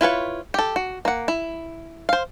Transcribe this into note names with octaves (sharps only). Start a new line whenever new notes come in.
E4 F4 B4 C#5
G4 A4
F#4
A#3 F#5
E4
C5 F5